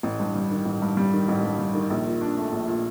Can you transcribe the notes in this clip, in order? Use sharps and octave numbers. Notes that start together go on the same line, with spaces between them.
A1
G2
G3
D#3
A1
G2
G3
D#3
A1
G2
G3
D#3
A#1
A#2
D4
A3
A#1
A#2